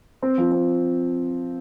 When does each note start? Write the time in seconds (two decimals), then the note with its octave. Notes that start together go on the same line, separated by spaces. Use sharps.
0.22 C4
0.38 F3
0.52 C4